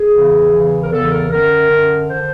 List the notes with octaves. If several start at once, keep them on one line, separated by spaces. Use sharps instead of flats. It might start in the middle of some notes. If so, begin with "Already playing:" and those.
Already playing: G#4
E2 C#3 E3
E2 C#3 E3
A#4
E2 C#3 E3 A4
A#4
F#2 D3 A#4
F#2 D3
D3 C5